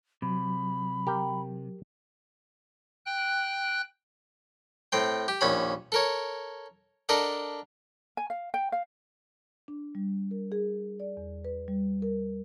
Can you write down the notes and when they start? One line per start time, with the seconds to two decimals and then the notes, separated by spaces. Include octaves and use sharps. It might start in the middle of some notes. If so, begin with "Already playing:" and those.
0.22 C3 F#3 B5
1.07 G4 A#4 G5
3.06 G5 F#6
4.92 A2 C4 G5
5.28 G4
5.41 A#1 D#2 C#4 B5
5.92 A4 A#4 C#5
7.09 D4 A4 A#4 D#5 F#5
8.17 G#5
8.30 F5
8.54 G5
8.72 F5
9.68 D4
9.95 G3
10.31 A#4
10.52 G#4
11.00 D5
11.17 E2
11.45 B4
11.68 G3
12.02 A#4